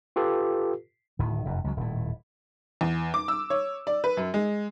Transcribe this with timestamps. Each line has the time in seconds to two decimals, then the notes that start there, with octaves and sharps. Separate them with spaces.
0.16 F4 G4 A4 B4
1.19 D1 A2 D#3
1.45 F1 F#2
1.64 C#2 F#3
1.77 D#1 A2
2.81 E2
3.14 D6
3.28 E6
3.50 C#5
3.87 D5
4.04 B4
4.17 F#2
4.34 G#3